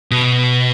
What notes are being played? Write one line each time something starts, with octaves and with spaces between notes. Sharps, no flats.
B2